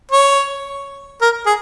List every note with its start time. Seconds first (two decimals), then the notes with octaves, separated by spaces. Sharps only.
0.11 C#5
1.22 A#4
1.46 G#4